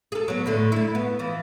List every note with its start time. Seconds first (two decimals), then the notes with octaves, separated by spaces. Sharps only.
0.12 G#4 A4
0.28 F#3 B3
0.46 A2 D3 A3
0.72 A3 E4
0.95 B3
1.19 E3 F3